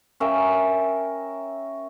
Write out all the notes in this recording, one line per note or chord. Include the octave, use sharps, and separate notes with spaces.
C#4 A#4 E5 G5